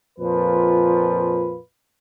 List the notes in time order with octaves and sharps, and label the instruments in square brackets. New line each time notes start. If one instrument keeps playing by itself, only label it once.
[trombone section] F2 A#2 F3 F4 B4